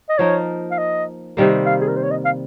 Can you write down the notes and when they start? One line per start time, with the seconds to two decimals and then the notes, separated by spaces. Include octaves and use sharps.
0.10 D#5
0.18 F3 A#3 D#4 A#4 C#5
0.71 F5
0.78 D#5
1.37 C3 D#3 G3 A#3
1.66 F5
1.81 G#4
1.88 A#4
1.97 C5
2.03 C#5
2.11 D#5
2.25 F5